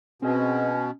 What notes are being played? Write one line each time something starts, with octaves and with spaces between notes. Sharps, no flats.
B2 C4 C#4 G#4 D#5